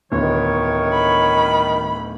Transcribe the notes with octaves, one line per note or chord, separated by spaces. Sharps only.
D1 D2 D#3 B3 C#5
B5